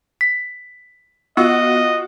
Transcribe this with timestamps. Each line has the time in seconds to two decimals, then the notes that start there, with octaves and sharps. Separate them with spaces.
0.21 B6
1.37 B3 F4 F#4 D#5